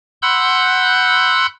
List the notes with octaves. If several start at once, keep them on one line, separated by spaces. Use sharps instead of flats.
F#5 B5 C6 E6 F#6 G6